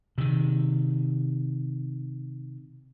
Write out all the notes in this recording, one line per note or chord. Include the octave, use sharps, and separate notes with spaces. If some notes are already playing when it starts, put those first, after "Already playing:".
C3 D#3